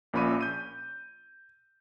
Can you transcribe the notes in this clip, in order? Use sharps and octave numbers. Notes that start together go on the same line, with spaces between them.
A#1 A#2 C#4 B5 C#6 D#7
G6 D#7